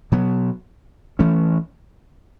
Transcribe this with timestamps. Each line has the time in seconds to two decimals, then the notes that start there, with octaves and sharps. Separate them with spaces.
0.12 B2 F#3 B3
1.19 E3 A3 C#4